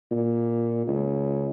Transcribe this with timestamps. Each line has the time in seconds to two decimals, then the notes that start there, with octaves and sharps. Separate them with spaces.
0.11 A#2
0.87 C#2